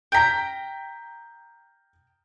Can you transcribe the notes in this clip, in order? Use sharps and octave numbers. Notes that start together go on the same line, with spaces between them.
G5 A#5 G6 B6